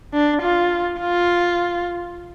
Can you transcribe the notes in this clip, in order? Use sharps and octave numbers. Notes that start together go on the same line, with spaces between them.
D4
F4
F4